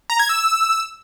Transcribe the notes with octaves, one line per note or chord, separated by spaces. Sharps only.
A#5
G#6
E6